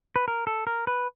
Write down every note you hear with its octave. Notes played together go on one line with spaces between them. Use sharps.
B4
A#4
A4
A#4
B4